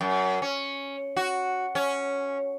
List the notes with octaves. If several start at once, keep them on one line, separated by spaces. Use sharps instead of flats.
F#2
C#4
F#4
C#4